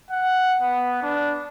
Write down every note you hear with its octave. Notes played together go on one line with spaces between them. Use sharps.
F#5
B3
D4